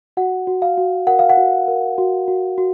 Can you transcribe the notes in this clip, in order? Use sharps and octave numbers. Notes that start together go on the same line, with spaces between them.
F#4 F#5
F#4
F5
F#4
A#4 F#5
F5
F#5
F#4
A#4
F#4
F#4
F#4